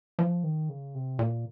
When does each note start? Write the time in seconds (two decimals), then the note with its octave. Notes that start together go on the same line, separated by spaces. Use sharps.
0.19 F3
0.43 D#3
0.69 C#3
0.95 C3
1.19 A#2